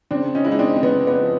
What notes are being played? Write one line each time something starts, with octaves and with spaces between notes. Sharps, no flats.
C#3 C4 D4
C#4 D#4
G#3 E4
D#4
C4 D4
C4
C#3 B3
B3
F3